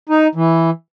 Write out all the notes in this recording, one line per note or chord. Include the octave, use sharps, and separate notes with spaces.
D#4
E3